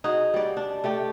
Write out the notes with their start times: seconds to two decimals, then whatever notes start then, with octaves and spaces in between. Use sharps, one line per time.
0.04 D#4 F#4 G#4
0.34 G3 D5
0.57 D4
0.84 A3 G4 D5